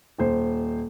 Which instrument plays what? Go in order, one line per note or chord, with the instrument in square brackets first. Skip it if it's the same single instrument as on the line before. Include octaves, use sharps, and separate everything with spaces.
[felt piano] D#1 C5